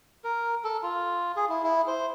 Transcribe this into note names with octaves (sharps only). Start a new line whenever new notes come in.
A#4
A4
F4
G#4
E4
E4
C5